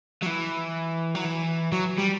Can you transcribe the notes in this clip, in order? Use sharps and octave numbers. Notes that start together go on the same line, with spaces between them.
F#3
E3
F#3
E3
F#3
G3